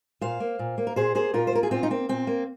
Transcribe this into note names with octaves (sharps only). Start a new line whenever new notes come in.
A#2 C5 F5
A#3
A#2
A#3
A#4
A#2 G#4 C5
A#3 G#4 C5
A#2 F4 A#4
C5
A#3 A#4
G#4
A#2 C4 F4
D#4
A#3 C4
A#2 C4
A#3